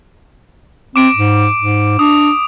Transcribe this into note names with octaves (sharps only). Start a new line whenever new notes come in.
C4 D6 D7
G#2
G#2
D4 D#6